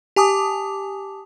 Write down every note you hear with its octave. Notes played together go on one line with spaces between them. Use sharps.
G4 G#5 A5 D6 D#6